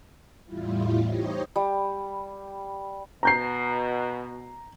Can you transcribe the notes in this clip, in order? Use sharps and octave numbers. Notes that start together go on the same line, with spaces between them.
E2 A2 G3 E4 F4
D#4 G4 C5 C#5 D#5
G3
B2 A#5 G6 C7